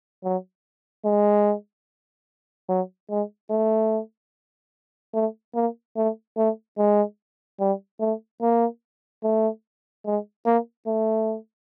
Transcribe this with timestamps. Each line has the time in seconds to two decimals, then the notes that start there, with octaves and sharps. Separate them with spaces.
0.24 F#3
1.05 G#3
2.69 F#3
3.10 G#3
3.50 A3
5.14 A3
5.54 A#3
5.96 A3
6.37 A3
6.78 G#3
7.60 G3
8.00 A3
8.41 A#3
9.23 A3
10.05 G#3
10.46 A#3
10.87 A3